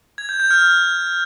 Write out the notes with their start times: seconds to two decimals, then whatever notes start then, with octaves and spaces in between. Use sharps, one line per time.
0.18 G#6
0.29 G6
0.40 G6
0.51 F6